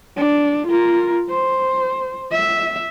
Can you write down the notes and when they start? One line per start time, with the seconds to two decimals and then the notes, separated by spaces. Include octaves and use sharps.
0.17 D4
0.67 F4 A#4
1.30 C5
2.32 E5